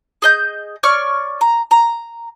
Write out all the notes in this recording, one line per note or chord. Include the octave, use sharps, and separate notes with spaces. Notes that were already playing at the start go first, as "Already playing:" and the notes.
G#4 D#5 G6
C#5 D5 C#6 F6
A#5
A#5